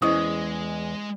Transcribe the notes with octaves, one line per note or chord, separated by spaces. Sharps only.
E2 G#3 C#4 E4 C5 D#5 D#6